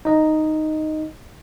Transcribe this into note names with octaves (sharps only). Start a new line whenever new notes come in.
D#4 D#5